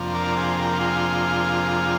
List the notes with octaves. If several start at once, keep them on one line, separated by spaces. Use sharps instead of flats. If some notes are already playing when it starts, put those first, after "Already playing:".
Already playing: F2 C3 F3 A#3 D4
A#4 D5
G#4 C5
G4 A#4
F4 G#4